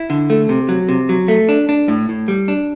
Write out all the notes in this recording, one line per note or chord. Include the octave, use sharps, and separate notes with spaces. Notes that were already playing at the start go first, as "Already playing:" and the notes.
Already playing: E4
D3
A3
C3
F#3
C3
F#3
A3
D4
D4
A2
A2
G3
D4